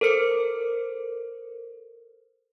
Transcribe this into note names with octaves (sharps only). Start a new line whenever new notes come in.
A4 A#4 C5 C#7